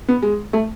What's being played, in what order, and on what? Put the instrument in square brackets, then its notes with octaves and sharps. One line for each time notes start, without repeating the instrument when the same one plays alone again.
[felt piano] B3
G#3
A3